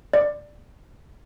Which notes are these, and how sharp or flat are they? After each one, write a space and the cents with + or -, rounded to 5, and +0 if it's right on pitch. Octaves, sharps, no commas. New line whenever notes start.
D5 +10